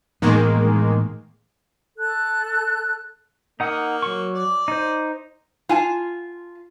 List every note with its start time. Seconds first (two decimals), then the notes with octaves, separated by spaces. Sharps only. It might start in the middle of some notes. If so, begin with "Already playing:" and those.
0.22 A2 D#3 E3 G#3 A#3 B3
1.97 A4 F#6
3.60 A#3 D#4 F#5 D#6
4.02 F#3 C#6
4.34 D5
4.68 D#4 C5
5.69 F4 G#5 A5